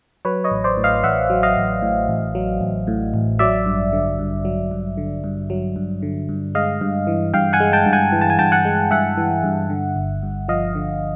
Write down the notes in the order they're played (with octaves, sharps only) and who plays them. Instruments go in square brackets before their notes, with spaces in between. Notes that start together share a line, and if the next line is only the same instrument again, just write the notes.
[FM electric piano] F#3 B4 C#5
C#5 D#5
A1
C5 D5
A2
D#5 F5
A1 E5 F#5
F#3
D#5 F5
A1
A2
A1
F#3
A1
A2
A1
F#3 D5 E5
G2
D3
G2
F#3
G2
D3
G2
F#3
G2
D3
G2
G#3 D#5 F5
G2
E3
G2 F5 G5
F#5 G#5
G#3
G5 A5
G2
F#5 G#5
E3
A5
G#5
G2 G5 A5
F#5 G#5
G#3
G2 E5 F#5
E3
G2
D3
G1
G2
F3 D#5 F5
D3